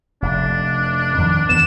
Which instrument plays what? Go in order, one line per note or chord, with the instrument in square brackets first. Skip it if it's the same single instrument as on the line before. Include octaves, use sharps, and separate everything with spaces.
[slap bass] F1 [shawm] D4
[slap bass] F2 D#3
[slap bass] D2 E3 B3 [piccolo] E7